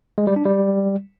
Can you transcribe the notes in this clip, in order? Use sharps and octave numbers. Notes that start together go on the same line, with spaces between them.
G#3
G3
D4
G3